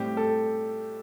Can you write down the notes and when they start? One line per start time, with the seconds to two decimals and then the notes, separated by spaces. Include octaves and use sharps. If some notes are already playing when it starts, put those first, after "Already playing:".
Already playing: A2 G3 C4 G4
0.17 A4